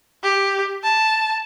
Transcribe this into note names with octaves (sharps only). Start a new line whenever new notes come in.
G4
A5